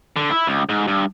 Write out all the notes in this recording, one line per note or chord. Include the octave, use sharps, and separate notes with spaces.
D3
E4
C#2
G#2
G2